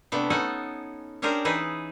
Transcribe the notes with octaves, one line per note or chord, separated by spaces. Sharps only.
C3 A3 B3 D4
C#4 D#4 A4 F#5 G#5
C#4 D4 G4 G#4 A#4 C5
E3 D#4 G#4 B4 E5